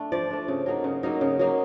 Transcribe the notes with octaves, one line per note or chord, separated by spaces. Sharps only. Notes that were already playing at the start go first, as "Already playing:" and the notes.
Already playing: A3 D4
F3 D5
A3 D4
C#3
F#3 A#3 D#4
C#3
F#3 A#3 D#4
C#3
F#3 A#3 D#4